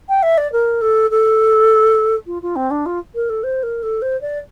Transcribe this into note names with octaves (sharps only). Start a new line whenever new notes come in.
G5
E5
D5
A#4
A4
A4
F4
F4
C4
D4
F4
A#4
A4
C5
A#4
A4
C5
D5